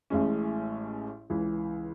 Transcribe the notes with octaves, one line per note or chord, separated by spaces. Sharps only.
A1 A2 G#3 C#4
C#2 C#3 E3